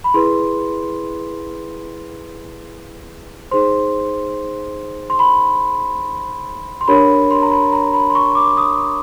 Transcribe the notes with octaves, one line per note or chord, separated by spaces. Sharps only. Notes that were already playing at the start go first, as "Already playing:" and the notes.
B5
E4 G#4 B4 C6
D#4 G#4 C5 C6
C6
B5
C6
D4 G4 A#4 C#5 B5
C6
A#5
B5
A#5
B5
C6
C#6
D6
D#6